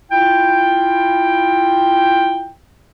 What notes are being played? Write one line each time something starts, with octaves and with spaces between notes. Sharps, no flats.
E4 F4 G5